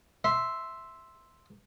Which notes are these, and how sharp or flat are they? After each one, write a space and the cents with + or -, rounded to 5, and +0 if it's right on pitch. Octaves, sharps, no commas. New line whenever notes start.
E5 +0 C6 +0